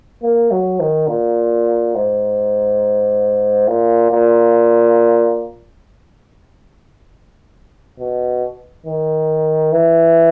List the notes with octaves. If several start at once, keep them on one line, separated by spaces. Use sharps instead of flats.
A#3
F#3
D#3
A#2
G#2
A#2
A#2
B2
D#3
E3